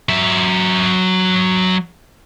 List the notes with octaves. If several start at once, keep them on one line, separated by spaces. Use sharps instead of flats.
F#3 E5